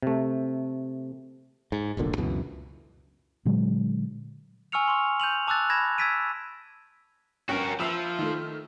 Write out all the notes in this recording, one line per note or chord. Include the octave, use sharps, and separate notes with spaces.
C3 A3
G#2
F1 B1 A#2 D3
C#2 F#2 B2 E3
A#2 D3 F#3 G#3
G#5 C#6 E6 F6 C#7 F7
C6 C#6
G6 D#7 F7 F#7
A5 D6 E6 F#6 A6
B5 G#6 A#6 E7
E6 G#6 A6 B6 D7 D#7
G1 C#4 F#4 A#4 G5
F3 E5 B5 E6
D#3 A3